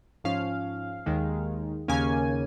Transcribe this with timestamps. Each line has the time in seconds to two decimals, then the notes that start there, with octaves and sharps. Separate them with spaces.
0.24 G#2 F3 C#4 F5
1.06 D#2 D#3 G#3
1.88 D#2 C#3 A#3 C#4 G#5